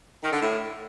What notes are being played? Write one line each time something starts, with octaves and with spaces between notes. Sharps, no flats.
D#3
D3
A2